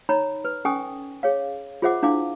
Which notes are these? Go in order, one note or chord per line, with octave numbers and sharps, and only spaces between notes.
D#4 C#5 A#5 B5
B4
C#4 A4 G5 G#5 C#6 D#6
G#4 C#5 F5
F4 G#4 C5 E5 F#5 D6
D4 E4 F5 D6